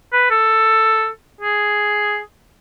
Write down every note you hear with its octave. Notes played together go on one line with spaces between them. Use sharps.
B4
A4
G#4